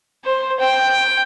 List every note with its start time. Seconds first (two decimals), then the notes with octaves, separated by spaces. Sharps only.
0.24 C5
0.60 G5